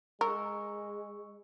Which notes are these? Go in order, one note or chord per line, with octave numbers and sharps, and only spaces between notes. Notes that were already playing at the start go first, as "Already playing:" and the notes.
G#3 A#4 C#6 E6